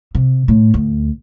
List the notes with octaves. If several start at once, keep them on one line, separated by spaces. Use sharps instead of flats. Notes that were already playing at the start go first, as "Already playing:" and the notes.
C3
A2
D2